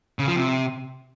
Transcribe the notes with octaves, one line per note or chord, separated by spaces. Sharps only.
C#3
F3
C3